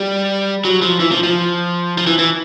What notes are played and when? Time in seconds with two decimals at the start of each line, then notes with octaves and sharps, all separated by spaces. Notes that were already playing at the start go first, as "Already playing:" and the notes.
Already playing: G3
0.65 F#3
0.82 F3
1.00 E3
1.12 F3
1.23 F3
1.98 F3
2.07 E3
2.19 E3